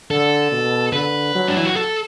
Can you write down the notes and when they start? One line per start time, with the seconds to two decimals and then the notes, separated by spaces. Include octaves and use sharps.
0.10 D3 A4
0.52 B2
0.93 D3 B4
1.35 F#3
1.48 D4
1.57 E4
1.66 F#4
1.76 A4